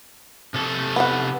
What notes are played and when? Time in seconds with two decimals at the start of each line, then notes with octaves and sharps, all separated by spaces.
0.54 C3 A4
0.96 B3 F#5